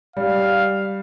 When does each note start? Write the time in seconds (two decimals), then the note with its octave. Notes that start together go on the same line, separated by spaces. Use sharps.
0.16 G3 F5